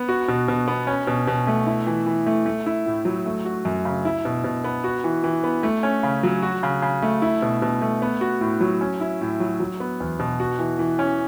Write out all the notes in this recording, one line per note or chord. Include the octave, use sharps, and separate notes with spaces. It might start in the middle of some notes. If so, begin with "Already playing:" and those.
Already playing: B3
F#4
B2
B2
B3
C#4
B2
B2
A3
E4
E3
E3
A3
A3
E4
A2
F#3
A3
F#4
F#2
C#3
E4
B2
B2
B3
F#4
E3
E3
B3
A3
C#4
C#3
F#3
F#4
C#3
C#3
A3
E4
B2
B2
A3
B3
F#4
A2
F#3
C#4
E4
A2
F#3
F#3
B3
E2
B2
F#4
E3
E3
C#4